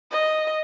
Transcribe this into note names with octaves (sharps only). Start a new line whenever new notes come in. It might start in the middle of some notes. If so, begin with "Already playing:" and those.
D#5